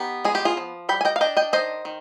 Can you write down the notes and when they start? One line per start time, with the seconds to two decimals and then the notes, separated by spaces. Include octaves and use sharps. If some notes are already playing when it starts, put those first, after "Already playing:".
Already playing: B3 D#4 G4
0.25 G#3 G#4
0.35 G4
0.45 F4 G#4
0.57 F3
0.89 G3 G5 B5
1.01 G#5
1.05 D#5 G5
1.16 F5
1.21 D4 D#5 G5
1.37 D#5 G5
1.53 D#3 C5 D#5
1.85 D#3